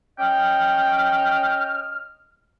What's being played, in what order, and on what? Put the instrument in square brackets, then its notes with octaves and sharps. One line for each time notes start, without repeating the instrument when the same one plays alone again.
[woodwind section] C#4 D#5 F6 [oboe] G5